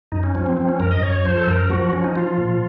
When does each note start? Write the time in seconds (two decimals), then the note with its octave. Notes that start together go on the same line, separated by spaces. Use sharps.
0.12 F#2 D#4
0.23 C#4
0.35 F3 C#4
0.46 C4
0.57 F3 C4
0.69 C#4
0.80 F#2 A#4
0.91 D#5
1.02 F#2 C#5
1.25 F3 C5
1.37 A4
1.47 F#2 A#4
1.70 F3 F#4
1.93 F3 C#4
2.04 D#4
2.16 F3 F4
2.27 F4
2.38 A#2